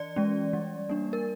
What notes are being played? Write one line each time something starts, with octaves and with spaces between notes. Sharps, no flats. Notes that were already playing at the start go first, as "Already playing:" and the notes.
Already playing: E3 D5
G#3 C#4
G3
A#3 D4
A#4